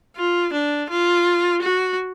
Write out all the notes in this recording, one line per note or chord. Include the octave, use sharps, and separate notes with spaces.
F4
D4
F4
F#4